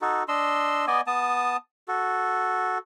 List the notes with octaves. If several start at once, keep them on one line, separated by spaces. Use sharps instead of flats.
D#4 F#4 A4
D4 D#5 C6 E6
B3 D5 D#5 G#5
B3 A5 D#6
F#4 A4